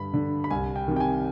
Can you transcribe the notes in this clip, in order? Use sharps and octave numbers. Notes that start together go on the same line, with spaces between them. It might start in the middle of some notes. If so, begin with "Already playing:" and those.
Already playing: G2 D3 B5
D3
B5
C2 G#5
G5
C3 D#3
G5
G#5